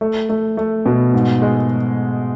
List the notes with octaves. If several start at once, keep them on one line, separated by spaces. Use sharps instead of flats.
A3
A3
A3
B2
G#2
G#3